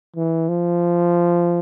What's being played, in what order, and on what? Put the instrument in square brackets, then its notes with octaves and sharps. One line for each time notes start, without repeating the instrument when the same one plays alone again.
[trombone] E3
F3